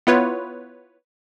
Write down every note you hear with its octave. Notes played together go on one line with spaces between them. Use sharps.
B3 E4 F4 B4 C#5